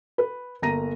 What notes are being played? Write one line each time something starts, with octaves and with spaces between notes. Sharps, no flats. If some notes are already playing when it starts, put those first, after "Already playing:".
B4
G1 A#3 A#5 A#6 D#7